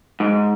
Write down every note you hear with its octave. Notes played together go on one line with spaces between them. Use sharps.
G#2